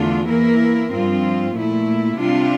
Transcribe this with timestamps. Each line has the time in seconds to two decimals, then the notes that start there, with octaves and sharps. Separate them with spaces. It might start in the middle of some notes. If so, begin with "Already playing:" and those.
Already playing: E2 D3 A3 D4 F4
0.28 E3 A#3 E4 A#4
0.92 G2 F3 C4 F4
1.55 A#2 A3 E4
2.18 C3 G3 D4 F4